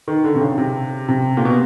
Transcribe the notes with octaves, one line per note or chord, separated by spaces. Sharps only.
D#3
D3
C3
C#3
C3
C3
A#2
B2